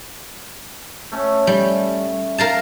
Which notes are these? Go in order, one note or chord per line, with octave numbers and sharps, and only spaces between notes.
A3 C#4
G3
A#4 F5 A5